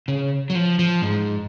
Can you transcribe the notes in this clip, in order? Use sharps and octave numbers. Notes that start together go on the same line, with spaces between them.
C#3
F#3
F3
F3
G#2